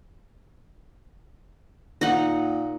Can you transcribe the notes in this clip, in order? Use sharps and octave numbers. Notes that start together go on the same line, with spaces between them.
A#2 D#4 F#5